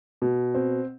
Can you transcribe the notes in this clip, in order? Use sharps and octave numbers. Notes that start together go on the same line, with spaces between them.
B2
C4